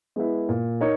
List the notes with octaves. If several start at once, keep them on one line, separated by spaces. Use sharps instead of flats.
G#3 B3 E4
A#2
D#4 A#4 C#5